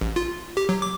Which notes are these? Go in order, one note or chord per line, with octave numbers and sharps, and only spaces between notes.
A1
F4
G4
F#3
D6